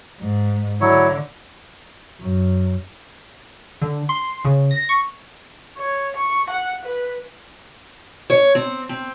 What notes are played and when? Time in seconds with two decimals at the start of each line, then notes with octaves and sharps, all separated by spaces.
0.20 G#2
0.81 D3 F#3 E4 C#5
2.20 F#2
3.82 D3
4.09 C6
4.45 C#3
4.71 A#6
4.89 C#6
5.77 C#5
6.16 C#6
6.50 F#5
6.85 B4
8.30 C#5
8.55 C4
8.89 C4